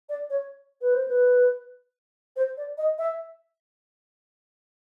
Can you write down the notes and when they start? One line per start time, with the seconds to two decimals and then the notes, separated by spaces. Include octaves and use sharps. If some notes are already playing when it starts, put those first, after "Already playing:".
0.09 D5
0.30 C#5
0.81 B4
0.94 C5
1.08 B4
2.36 C5
2.57 D5
2.78 D#5
2.98 E5